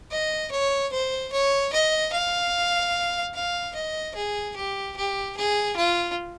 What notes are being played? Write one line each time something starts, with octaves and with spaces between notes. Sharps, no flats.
D#5
C#5
C5
C#5
D#5
F5
F5
D#5
G#4
G4
G4
G#4
F4